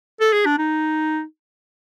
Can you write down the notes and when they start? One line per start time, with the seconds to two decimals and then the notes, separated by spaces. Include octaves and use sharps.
0.21 A4
0.33 G#4
0.46 D4
0.58 D#4